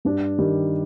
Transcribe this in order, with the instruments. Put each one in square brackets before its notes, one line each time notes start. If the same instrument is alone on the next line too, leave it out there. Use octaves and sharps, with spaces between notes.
[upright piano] G2 D4
D#3 G3